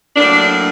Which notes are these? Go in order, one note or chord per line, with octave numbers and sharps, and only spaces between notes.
A2 F#3 A#3 D4